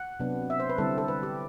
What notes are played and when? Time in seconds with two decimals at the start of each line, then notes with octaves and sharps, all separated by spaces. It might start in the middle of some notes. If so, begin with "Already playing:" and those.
Already playing: F#5
0.20 C3 F#3 B3 D4
0.50 E5
0.60 C5
0.70 B4
0.78 D3 G3 C4 E4 A4
0.98 A4
1.08 B4
1.23 G4